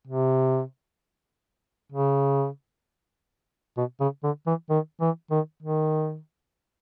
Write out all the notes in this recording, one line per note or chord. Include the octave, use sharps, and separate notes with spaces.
C3
C#3
B2
C#3
D3
E3
D#3
E3
D#3
D#3